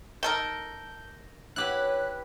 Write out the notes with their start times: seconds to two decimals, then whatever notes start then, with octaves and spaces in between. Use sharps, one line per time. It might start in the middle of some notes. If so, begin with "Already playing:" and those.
0.23 D#3 A4 A#4 G6
1.56 E4 G4 B4 C#5 F#6